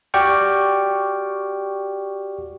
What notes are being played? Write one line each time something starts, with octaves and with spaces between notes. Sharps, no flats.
F#4 G4 D5 G5 C#6 F6